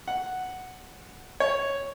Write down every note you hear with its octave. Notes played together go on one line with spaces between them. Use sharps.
F#5
C#5